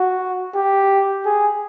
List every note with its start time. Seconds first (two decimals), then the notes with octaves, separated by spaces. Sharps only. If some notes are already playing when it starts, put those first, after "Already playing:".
Already playing: F#4
0.55 G4
1.26 G#4